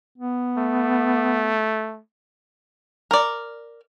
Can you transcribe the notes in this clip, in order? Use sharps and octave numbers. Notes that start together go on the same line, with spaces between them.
B3
A3
A#4 D5